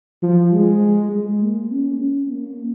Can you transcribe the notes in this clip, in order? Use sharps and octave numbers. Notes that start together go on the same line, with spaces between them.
F3
G#3
G#3
A#3
C#4
C#4
A#3